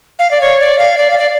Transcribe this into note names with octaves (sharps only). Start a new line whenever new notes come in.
F5
D5
C#5
D5
F5
D5
F5
D5